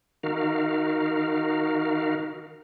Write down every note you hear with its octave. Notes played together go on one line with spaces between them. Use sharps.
D#3 D#4 F#4 A#4 F5